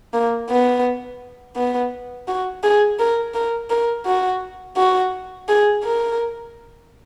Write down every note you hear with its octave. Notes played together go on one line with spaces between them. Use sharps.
A#3
B3
B3
F#4
G#4
A#4
A#4
A#4
F#4
F#4
G#4
A#4